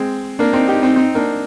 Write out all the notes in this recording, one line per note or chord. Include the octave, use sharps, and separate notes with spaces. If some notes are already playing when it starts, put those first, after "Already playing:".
Already playing: G#3 C4
A#3 D4
C4 D#4
D#4 G4
C4 D#4
C4 D#4
A#3 D4